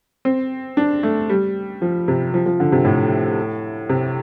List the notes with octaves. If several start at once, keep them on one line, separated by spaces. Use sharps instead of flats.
C4
D4
A3
G3
F3
C3
F3
F3
D3
C3
A2
C3